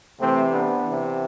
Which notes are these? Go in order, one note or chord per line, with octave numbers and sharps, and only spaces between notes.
C3 E3 A3 C4
B3 D4
C3 E3